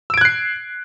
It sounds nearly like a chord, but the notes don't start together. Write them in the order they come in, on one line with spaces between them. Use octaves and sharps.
E6 D7 G#6 F#6 C7